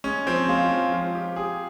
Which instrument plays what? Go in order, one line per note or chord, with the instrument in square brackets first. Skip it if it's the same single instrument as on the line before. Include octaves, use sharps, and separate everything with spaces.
[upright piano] G#3 [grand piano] C#4
[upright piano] F3 [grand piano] C4
[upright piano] G#3 [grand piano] F4
[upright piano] F3
F3
G4
[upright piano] G4 [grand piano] G#4